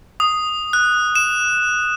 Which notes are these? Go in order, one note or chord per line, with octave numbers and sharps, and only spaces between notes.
D#6
F#6
E7